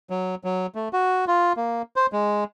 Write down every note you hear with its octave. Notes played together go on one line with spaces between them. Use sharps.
F#3
F#3
A3
F#4
F4
A#3
C5
G#3